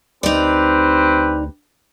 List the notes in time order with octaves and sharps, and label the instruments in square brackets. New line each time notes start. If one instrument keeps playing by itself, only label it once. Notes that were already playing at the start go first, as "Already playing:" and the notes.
[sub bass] D2 [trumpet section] C4 G4 B4 [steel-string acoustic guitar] D#4 D5